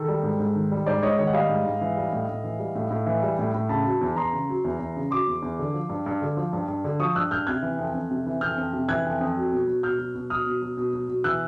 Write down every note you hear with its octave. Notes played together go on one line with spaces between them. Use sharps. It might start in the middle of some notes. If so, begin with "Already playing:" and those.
Already playing: D#3 A4
G3
G#2
G#2
D#3
G3
G#2 C5 D5
G#2 C#5 D#5
D#3 C#5 D#5
F#5
G3 D#5 F5
G#2
G#2
E3
G3
A2
A2
E3
G3
A2
A2
E3
G3
A2
A2
C#3 A5 B5
F#3
E2
E2 A#5 C6
C#3
F#3
E2
E2
C#3
F#3 C6 D6
E2
E2
D3
F3
G2
G2
D3
F3
G2
G2
D3
F3 C#6 D#6
G2 E6 F#6
G2 F6 G6
C3 F#6 G#6
E3
F2
F2
C3
E3
F2 F6 G6
F2
C3
E3 F#6 G#6
F2
F2
F#3
B2
F#3
B2 F6 G6
F#3
B2
F#3 D#6 F6
B2
F#3
B2
F#3
B2
E3 E6 F#6